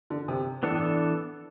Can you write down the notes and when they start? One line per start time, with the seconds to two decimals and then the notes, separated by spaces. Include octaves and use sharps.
0.10 D3
0.28 C3
0.63 E3 B3 D4 A4
0.71 A2